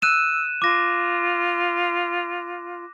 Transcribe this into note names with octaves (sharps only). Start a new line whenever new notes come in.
E6 F#6 D#7 E7
F4 D6 A#6